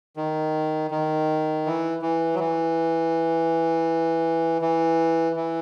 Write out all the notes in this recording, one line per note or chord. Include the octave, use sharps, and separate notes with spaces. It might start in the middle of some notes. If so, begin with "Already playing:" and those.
D#3
D#3
E3
E3
F#3
E3
E3
E3